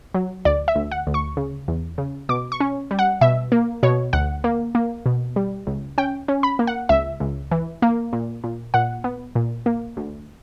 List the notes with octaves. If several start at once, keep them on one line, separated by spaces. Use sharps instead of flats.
F#3
D2 D5
E5
D2
F#5
D2
C#6
C#3
E2
C#3
B2 D6
C#6
C#4
G3
F#5
B2 E5
A#3
B2 C#5
D2 F#5
A#3
A#3
B2
G3
C#2
C#4 G5
C#4
B5
A#3
F#5
C#2 E5
C#2
E3
A#3
A#2
A#2
A#2 F#5
B3
A#2
A#3
D2